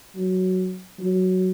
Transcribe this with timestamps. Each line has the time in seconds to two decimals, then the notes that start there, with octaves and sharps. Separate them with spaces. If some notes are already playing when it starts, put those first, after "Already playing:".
0.16 F#3
0.99 F#3